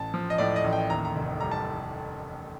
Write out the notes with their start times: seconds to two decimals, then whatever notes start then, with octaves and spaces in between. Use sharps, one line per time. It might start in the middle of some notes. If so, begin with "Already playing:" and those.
Already playing: A1 A5
0.14 F3
0.30 D#5
0.38 A2 D5
0.56 D#5
0.64 A1
0.73 G5
0.90 D#2 A#5
1.05 A#5
1.16 F1
1.40 G3 A#5
1.52 A5